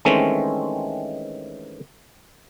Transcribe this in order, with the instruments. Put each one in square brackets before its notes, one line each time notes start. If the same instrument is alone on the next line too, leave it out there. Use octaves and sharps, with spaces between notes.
[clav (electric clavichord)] D#3 E3 G#3 A3 C4 C#4